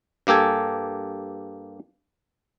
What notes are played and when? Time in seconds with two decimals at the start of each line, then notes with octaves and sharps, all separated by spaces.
0.27 G2 A#3 G4 A4 G#5